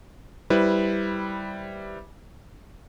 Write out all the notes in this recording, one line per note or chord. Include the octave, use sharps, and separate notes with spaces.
G3 E4 B4 C5